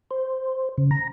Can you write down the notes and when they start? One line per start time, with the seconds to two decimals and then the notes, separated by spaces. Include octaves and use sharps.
0.11 C5
0.78 C#3
0.91 A#5